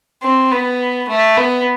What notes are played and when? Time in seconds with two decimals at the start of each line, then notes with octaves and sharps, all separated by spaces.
0.23 C4
0.51 B3
1.08 A3
1.37 B3